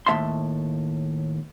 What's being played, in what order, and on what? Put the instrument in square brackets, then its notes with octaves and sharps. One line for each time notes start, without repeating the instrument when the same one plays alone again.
[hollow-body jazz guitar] D#2 A2 D#4 E5 A5 C6